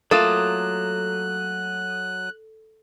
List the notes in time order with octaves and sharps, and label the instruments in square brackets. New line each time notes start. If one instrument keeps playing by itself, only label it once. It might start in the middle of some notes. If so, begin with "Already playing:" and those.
[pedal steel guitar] F#3 D#6 [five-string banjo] A3 A#3 F4 [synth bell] A4 [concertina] F#6